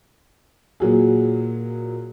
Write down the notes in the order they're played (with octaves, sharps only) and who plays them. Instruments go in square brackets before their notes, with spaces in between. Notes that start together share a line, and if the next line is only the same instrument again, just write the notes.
[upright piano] A#2 F#3 G#4